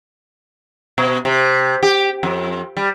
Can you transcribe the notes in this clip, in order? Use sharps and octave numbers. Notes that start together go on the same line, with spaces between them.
B2
C3
G4
F2
G3